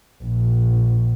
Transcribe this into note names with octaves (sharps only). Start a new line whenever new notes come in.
A#1